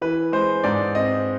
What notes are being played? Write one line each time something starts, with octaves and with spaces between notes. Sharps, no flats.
E3 B4
G#3 C5
G#2 D5
C4 D#5